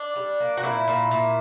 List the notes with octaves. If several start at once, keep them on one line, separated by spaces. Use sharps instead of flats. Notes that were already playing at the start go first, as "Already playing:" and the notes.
Already playing: D4
G3
A#3
F#4
A#2 E4
A#2
A#2